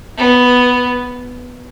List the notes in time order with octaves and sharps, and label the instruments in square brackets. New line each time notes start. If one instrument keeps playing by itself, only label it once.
[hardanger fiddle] B3